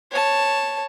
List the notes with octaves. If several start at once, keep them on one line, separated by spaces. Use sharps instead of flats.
C#5 A5